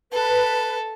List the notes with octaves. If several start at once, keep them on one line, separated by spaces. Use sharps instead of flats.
A4 B4